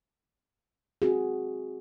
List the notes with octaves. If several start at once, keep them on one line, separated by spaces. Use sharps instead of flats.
C4 F#4 G#4